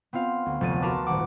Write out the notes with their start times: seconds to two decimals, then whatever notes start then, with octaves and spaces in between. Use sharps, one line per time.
0.13 B3 C4 F4 F5
0.46 D2
0.61 F1 D2 A6 D#7
0.82 F4 F#4 A#4 B4 A5 D6
1.06 D#1 G#1 F#5 D6